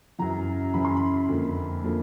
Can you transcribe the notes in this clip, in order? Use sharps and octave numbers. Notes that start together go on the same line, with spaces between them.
F#2 C#3 E3 A#5
F#2 C#3 E3 B5
C6
B5
F2 D3 F3 A#3
D3 F3 A#3